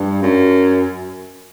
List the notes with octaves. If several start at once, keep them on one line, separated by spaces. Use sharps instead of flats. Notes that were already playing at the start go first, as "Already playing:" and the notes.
Already playing: G2
F#2